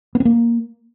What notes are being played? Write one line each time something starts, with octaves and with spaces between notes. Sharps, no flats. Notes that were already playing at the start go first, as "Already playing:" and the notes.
B3
C4
A#3